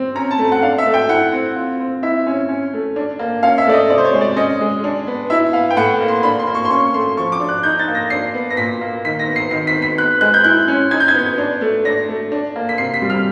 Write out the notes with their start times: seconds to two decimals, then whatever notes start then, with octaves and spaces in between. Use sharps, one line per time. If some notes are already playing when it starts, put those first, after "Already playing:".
Already playing: C4
0.15 C#4 A#5
0.31 A5
0.38 A3
0.52 F#5
0.62 D4 F5
0.78 E5
0.86 A3
0.94 G5
1.09 E4 F#5
1.32 C4
1.56 F4
1.80 C4
2.02 E4 E5
2.27 C#4
2.49 C#4
2.73 A3
2.96 D4
3.19 A#3
3.43 C#4 F5
3.58 E5
3.67 A3 D5
3.73 D#5
3.89 C3 D5
3.98 C5
4.05 C#5
4.14 G#3
4.21 D5
4.36 C#4 D#5
4.60 G#3
4.84 D4
5.07 B3
5.30 E4 E5
5.53 B3 F5
5.70 G5
5.76 A2 F#5
6.01 A#3
6.08 C6
6.23 D4 B5
6.39 C6
6.47 A#3
6.55 C#6
6.65 C6
6.70 C#4 C#6
6.94 A3 C6
7.17 F3 C#6
7.32 D6
7.40 D4
7.49 F#6
7.63 D#4 G6
7.79 A6
7.88 A#3
7.95 A#6
8.10 D4 C7
8.34 B3
8.50 A#6
8.57 A#2 B6
8.81 A#3
9.05 D#3 B6
9.19 A#6
9.28 B3
9.36 C7
9.51 D#3 C7
9.67 B6
9.75 B3
9.82 B6
9.98 B3 F#6
10.21 G#3 F#6
10.34 G6
10.44 E4 F#6
10.68 C#4
10.91 D#4 G#6
11.00 G6
11.08 G#6
11.15 B3
11.38 D4
11.61 A3
11.85 D4 A#6
12.08 A3
12.32 D4
12.56 A#3
12.69 B6
12.78 C3 C7
12.94 B6
13.02 G3
13.10 F6